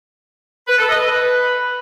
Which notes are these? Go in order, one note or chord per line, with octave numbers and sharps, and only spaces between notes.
B4
A4
D#5
B4
B4